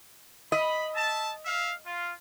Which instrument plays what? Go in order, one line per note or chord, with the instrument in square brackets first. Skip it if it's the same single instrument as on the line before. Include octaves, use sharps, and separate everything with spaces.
[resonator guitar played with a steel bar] D#5 [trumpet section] B5
[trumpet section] E5 A5
E5 F5
F4